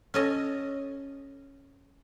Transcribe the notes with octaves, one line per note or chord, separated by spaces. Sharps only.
C#4 A4 D#5